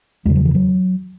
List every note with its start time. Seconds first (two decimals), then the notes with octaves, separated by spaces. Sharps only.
0.25 E2 C#3 G#3
0.35 F#3
0.45 E3
0.55 F#3